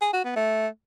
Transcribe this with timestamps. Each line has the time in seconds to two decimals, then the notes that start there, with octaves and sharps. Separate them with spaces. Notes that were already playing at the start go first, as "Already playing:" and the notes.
0.01 G#4
0.13 F#4
0.24 B3
0.36 A3